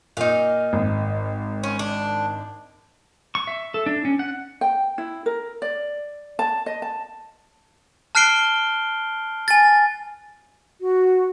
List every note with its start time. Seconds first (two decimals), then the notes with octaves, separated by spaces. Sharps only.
0.17 A#2 D#4 F5
0.73 G#1
1.64 C#4
1.79 D4
3.35 C#6
3.47 E5
3.74 A4
3.86 D4
4.05 C#4
4.19 F#5
4.61 G5
4.98 E4
5.26 A#4
5.62 D5
6.39 A5
6.66 D#5
6.82 A5
8.15 A5 F6 F#6 C7 D7 G7
9.48 G#5 A6
10.81 F#4